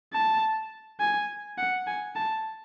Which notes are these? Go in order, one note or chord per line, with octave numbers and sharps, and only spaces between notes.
A5
G#5
F#5
G#5
A5